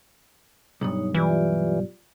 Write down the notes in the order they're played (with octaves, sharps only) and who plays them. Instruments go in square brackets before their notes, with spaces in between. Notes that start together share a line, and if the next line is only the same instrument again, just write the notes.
[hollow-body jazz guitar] B1 G2 [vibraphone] D#4 C#5
[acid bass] E3 [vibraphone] F4 G4 D5